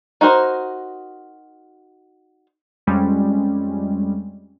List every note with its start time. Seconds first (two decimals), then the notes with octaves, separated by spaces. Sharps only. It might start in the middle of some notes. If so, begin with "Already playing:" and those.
0.21 D#4 F#4 A#4 C5
2.87 F2 G3 G#3 C#4